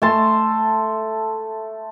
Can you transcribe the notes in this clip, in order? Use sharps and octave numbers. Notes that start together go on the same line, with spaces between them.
A3 A5 C6